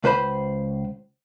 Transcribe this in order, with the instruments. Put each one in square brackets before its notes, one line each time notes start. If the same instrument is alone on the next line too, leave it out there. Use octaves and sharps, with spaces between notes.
[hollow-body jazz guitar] C#2 B4 C5 B5